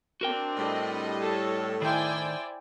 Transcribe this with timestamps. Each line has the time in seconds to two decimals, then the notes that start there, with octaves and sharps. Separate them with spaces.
0.21 C4 D4 F#4 A#4 G5
0.57 A2 G3 D#5
1.19 A4 C#5
1.82 D#3 E4 C5 D5 G5 G#5